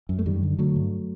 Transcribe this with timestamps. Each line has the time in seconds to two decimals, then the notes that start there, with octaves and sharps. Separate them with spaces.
0.09 F#2
0.19 A3
0.26 F#2 D#3 G3
0.43 D3
0.58 D3 F#3 A3
0.76 G2